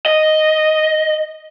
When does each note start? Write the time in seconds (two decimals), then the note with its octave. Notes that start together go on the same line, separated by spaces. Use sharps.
0.06 D#5